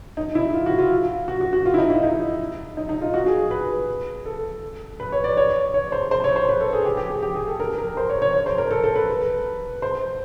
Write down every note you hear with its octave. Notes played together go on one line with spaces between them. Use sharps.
D#4
E4
F4
F#4
F4
F#4
F#4
F#4
F4
E4
D#4
E4
D#4
D#4
D#4
F4
F#4
G#4
B4
A4
B4
C#5
D5
C#5
C#5
C5
C5
C#5
C5
B4
A4
G#4
G4
G4
G#4
G4
G#4
A4
A#4
A#4
C5
C#5
C#5
C#5
C5
A#4
A4
A4
B4
C5